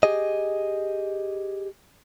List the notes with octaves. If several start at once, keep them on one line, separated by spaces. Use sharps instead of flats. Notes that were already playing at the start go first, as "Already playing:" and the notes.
G4 G#4 D#5